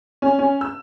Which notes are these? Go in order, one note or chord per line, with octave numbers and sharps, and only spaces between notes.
C#4
C#4
E6